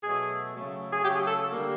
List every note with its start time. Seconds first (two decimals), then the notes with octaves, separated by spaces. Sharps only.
0.04 B2 F#3 A3 G#4
0.53 C#3 F#3 A3
0.92 G#4
1.02 C#3 F#3 A3 G4
1.15 G#4
1.27 A4
1.51 D3 G3 A#3